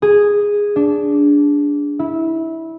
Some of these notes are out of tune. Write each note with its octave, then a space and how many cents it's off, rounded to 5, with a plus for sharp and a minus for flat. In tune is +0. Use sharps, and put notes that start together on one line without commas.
G#4 -10
D4 -15
E4 -20